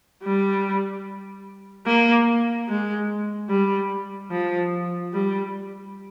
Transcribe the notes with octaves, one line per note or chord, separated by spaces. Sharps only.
G3
A#3
G#3
G3
F3
G3